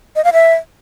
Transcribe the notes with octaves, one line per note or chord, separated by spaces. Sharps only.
D#5
F5
E5